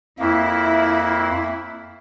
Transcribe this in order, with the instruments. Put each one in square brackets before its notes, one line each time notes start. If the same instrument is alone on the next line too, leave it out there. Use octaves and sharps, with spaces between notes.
[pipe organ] F2 A#3 [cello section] E4